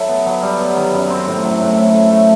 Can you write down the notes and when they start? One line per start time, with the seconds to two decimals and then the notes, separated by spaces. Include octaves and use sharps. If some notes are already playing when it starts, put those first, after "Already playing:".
Already playing: F#3 E4 A4
0.09 B3
0.26 F#3
0.42 G3
0.59 B3
0.75 D#3
0.93 F#2
1.10 C4
1.27 A2
1.44 F#3
1.61 A2
1.77 E4
1.94 A4
2.10 A3